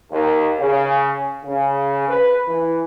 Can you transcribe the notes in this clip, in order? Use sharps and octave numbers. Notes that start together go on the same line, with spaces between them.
D#2
C#3
C#3
B4
E3